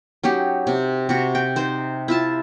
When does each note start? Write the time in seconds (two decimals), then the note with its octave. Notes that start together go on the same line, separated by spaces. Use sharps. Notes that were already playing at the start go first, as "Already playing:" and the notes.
0.23 F#3 C#4 D#4 G4
0.67 C3
1.09 C3 F#4
1.35 G5
1.56 D#4 C5
2.08 E4 F4 A5